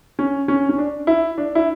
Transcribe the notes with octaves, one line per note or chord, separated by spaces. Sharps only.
C#4
C#4
C#4
D4
E4
D4
E4